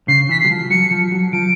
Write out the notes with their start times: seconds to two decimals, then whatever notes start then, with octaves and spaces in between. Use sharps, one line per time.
0.08 C#3 C7
0.29 E3 B6
0.40 C7
0.45 F#3
0.50 F3
0.70 F#3 C#7
0.91 F3
1.12 F#3
1.33 F3 D7